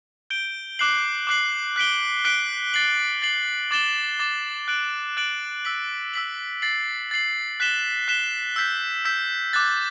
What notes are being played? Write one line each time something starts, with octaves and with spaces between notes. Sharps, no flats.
G6 D7 G7
D6 F#6 C7 F#7
D6 F#6 C7 F#7
F#6 B6 D7 G7
F#6 B6 D7 G7
A6 C7 F#7
A6 C7 F#7
D6 A6 E7 G7
D6 A6 E7 G7
F#6 A6 D7 F#7
F#6 A6 D7 F#7
E6 B6 F#7
E6 B6 F#7
A6 C7 F#7
A6 C7 F#7
F#6 B6 E7 G7
F#6 B6 E7 G7
E6 G6 B6
E6 G6 B6
D6 F#6 A6